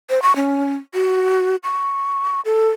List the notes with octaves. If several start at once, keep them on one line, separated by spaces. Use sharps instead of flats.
C5
C#6
C#4
F#4
C#6
A4